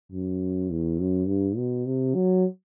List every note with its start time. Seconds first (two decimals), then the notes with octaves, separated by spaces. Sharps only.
0.12 F#2
0.70 E2
0.99 F#2
1.27 G2
1.57 B2
1.86 C3
2.14 F#3